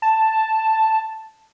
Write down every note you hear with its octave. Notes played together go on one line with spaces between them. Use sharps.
A5